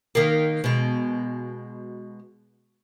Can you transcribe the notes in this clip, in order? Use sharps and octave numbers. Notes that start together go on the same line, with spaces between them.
D#3 A#3
B2 G#3